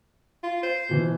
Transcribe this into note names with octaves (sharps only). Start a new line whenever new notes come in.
F4
C5
B2 E3